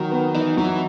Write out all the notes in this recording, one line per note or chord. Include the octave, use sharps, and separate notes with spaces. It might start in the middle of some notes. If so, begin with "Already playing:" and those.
Already playing: D#3 F#3
B3
E3 D#4
E3 F#3